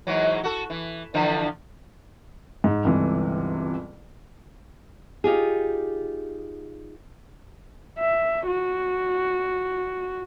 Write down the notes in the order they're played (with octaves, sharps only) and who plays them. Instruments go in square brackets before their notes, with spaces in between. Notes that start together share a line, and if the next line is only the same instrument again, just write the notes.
[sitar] G#2 E3 F#3
F#4 A4
E3
D3 E3 F3
[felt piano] G#2
G1 C#2 C3 E3
[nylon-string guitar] D#4 F4 G4 G#4
[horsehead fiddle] E5
F#4